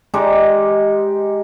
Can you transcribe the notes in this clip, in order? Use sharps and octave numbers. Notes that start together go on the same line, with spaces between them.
G#3 D#4 G4 D5